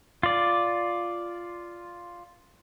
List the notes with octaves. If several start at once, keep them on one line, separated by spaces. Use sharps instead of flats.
F4 D5